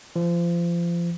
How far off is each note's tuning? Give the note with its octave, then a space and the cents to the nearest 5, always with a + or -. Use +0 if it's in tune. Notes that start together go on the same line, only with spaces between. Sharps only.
F3 -30